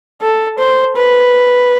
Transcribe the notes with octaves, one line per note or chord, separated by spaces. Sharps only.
A4
C5
B4